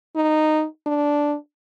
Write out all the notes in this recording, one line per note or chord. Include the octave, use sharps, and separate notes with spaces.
D#4
D4